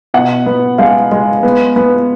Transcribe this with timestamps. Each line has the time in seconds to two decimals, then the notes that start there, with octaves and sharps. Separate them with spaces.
0.14 B2 F#5
0.46 B3
0.78 G#3 F5
1.11 G#3
1.43 B3
1.76 B3